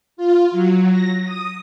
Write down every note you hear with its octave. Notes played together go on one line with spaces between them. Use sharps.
F4
F#3
A#6
D#6